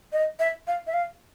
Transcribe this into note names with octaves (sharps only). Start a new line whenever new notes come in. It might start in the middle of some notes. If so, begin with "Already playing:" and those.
D#5
E5
F5
E5
F5